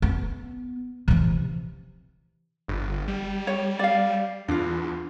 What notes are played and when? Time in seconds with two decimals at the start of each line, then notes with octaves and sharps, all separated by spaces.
0.02 B3
1.08 C3 E3
2.68 G1
3.08 G3
3.47 C#5
3.79 D5 F5
4.48 E2 D4 F4